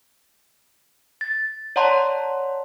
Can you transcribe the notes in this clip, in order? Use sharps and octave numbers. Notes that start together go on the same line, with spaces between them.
A6
C#5 D5 F#5 A5 A#5 C6